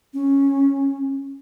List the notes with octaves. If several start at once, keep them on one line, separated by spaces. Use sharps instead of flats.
C#4